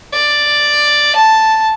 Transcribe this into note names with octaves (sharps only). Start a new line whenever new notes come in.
D5
A5